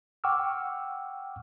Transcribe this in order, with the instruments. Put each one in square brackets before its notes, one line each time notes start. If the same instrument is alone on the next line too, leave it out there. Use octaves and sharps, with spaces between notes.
[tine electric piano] F#5 G5 C#6 D6 E6 F6